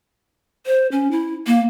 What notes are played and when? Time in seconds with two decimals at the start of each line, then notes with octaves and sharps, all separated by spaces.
0.66 C5
0.92 C#4
1.11 E4
1.47 A#3